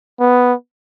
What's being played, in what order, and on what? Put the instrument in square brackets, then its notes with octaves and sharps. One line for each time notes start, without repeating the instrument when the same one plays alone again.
[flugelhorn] B3